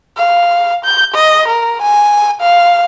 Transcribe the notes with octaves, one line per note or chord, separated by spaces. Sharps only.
F5
G6
D#5
A#4
G#5
F5